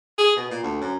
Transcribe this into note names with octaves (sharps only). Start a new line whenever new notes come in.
G#4
B2
A#2
D2
F#2